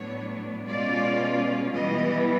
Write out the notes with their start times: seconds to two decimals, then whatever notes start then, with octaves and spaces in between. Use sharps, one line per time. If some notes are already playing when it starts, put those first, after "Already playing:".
Already playing: A2 F#3 B3 D4 C#5
0.66 B2 G#3 C#4 F4 D5
1.73 E3 G3 B3 D#5